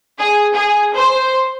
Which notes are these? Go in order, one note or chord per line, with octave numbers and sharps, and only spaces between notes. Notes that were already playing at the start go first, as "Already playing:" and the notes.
G#4
G#4
C5